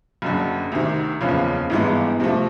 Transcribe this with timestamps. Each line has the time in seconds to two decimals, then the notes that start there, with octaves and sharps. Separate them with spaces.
0.22 F#1 F#2 D3
0.72 D2 C3 D#3
1.21 F#1 E2 C#3 F3
1.70 G#1 G2 E3 G#3 B3
2.20 C3 F3 A3